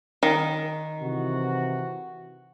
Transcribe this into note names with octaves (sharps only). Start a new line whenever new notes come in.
D#3
C3 E3 F#4